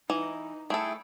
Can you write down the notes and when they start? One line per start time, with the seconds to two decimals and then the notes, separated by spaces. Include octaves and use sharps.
0.10 E3 D#4
0.70 A3 E4 G#4 A4 G5